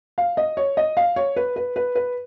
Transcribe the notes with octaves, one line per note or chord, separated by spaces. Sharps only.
F5
D#5
C#5
D#5
F5
C#5
B4
B4
B4
B4